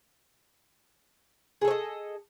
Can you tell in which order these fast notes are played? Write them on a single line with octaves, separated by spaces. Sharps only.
G#4 A4 C#5 D#5